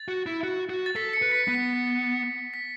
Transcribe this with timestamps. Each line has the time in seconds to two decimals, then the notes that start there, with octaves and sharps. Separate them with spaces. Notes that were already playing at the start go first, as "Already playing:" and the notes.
Already playing: A6
0.08 F#4
0.26 E4
0.43 F#4
0.69 F#4
0.86 A6
0.96 A4 B6
1.13 C#7
1.22 B4
1.31 B6
1.48 B3 B6
2.54 B6